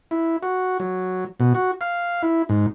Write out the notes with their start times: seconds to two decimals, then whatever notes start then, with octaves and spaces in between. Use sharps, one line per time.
0.11 E4
0.43 F#4
0.80 F#3
1.40 B2
1.55 F#4
1.81 F5
2.22 E4
2.49 G#2